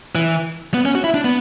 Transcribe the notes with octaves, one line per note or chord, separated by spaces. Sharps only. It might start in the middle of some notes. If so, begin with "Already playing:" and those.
E3
B3
C#4
F#4
E4
D4
B3